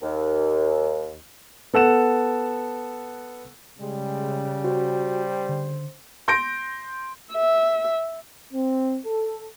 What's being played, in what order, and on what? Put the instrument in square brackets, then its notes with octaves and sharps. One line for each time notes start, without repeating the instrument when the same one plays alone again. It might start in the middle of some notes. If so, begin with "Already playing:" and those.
[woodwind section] D#2
[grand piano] B3 A4 F#5 E7
[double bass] C#3 [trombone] G3 [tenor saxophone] G#3
[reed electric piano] F#4 [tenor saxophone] C5
[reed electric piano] D3
[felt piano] C6 G6 A#6 D7
[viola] E5
[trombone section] C4
A4